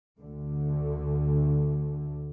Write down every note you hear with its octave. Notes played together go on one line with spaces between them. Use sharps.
D2 D3